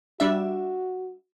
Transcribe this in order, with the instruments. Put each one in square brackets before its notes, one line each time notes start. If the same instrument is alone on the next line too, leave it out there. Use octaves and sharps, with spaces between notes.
[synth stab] G3 D4 E5 [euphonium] F#4